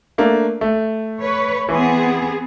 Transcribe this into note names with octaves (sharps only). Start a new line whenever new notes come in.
A3 A#3 D4
A3
B4 C#5
E3 B3 C4 G#4